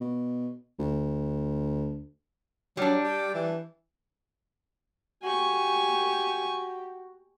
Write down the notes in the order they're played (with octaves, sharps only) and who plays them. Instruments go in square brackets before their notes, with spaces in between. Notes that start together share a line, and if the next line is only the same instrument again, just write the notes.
[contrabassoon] B2
D2
[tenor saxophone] F#3 [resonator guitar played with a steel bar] G3 D4
[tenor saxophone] G4
E3
[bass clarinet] F#4 [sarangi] G4 [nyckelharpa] G#5 C#6